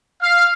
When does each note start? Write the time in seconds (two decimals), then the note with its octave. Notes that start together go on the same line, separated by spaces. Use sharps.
0.21 F5